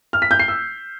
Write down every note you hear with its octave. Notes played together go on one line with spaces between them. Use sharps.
F6
B6
G6
C7
E6